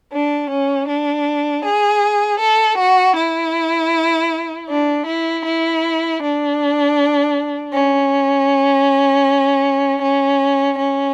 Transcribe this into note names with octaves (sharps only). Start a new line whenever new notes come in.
D4
C#4
D4
G#4
A4
F#4
E4
D4
E4
E4
D4
C#4
C#4
C#4